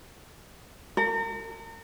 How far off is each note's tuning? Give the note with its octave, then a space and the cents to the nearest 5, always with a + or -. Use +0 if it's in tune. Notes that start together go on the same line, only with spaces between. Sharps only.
A#4 -40